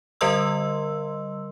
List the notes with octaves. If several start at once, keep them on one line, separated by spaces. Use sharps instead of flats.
D3 G3 A#4 D#5 C6 E6